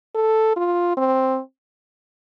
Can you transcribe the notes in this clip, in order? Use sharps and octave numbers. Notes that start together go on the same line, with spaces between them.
A4
F4
C4